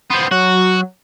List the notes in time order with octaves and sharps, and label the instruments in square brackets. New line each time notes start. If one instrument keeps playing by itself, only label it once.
[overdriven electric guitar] B3 C4 [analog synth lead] C6
[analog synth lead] F#3 [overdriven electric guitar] F#4